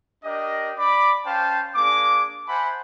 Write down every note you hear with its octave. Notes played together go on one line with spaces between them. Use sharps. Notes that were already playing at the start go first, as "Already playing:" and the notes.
D4 G4 A#4 D#5
D5 B5 D6
C#4 C5 F5 G5 A5
A#3 D4 G#4 D6
C5 E5 F#5 G#5 A5 B5